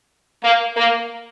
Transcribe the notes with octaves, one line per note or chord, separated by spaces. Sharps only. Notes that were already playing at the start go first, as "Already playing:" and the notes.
A#3
A#3